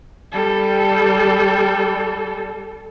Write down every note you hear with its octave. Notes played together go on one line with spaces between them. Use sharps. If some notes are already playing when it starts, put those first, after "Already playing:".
G3 A4